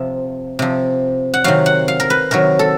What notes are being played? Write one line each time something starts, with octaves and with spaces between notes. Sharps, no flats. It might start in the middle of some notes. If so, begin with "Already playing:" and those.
Already playing: C3 F3 E5
C3 F3
F#5
C3 D#3 F#3 F5
F#5
F5
A#4
B4
C3 D#3 F#3 A#4
A4